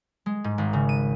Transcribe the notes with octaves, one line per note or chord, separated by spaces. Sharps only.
G#3
G#2
G#1
C#3
D#7